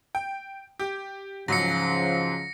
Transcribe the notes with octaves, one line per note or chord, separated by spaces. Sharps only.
G5
G4
G#2 C#3 F3 F#3 A#6 C#7